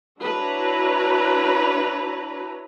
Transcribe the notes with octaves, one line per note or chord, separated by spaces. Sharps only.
D4 E4 F#4 B4 C#5 A#5